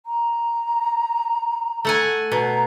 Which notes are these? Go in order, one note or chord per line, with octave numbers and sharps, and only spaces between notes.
A#5
A3 F#5 G#5
B2 A#5